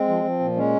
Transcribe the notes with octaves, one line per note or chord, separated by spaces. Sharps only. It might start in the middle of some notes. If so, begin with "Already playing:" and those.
Already playing: G#3 C4
F3
F3
A#2
G#3 C#4